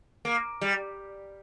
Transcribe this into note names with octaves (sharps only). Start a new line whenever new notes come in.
A#3
G3